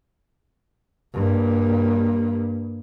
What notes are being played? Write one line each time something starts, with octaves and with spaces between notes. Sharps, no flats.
G2 A#3